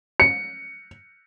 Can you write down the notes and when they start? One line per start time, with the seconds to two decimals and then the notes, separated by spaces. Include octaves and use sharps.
0.20 C#7